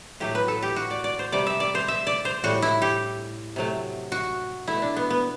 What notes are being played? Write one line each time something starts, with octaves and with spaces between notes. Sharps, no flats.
A2 F#3 A3 G4
B4
A4
G4
F#4
D5
D5
C5
C3 G3 D5
E5
D5
C5
E5
D5
C5
A2 G3 F#4
E4
G4
C3 F#3 A3
F#4
B2 A3 E4
D4
B3
B3